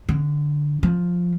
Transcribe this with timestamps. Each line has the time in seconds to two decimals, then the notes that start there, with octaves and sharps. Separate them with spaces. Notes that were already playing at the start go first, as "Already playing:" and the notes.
0.09 D3
0.83 F3